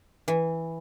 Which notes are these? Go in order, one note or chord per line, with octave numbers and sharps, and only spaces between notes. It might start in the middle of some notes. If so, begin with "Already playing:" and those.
E3